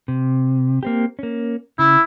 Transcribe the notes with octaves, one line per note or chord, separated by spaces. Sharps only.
C3
A#3 C4 G4
A#3 C#4
C#3 E4